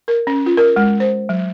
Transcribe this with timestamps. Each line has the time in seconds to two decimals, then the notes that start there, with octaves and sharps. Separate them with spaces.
0.08 A#4
0.27 C#4
0.46 F4
0.57 A#4
0.76 G#3
1.00 C5
1.29 F#3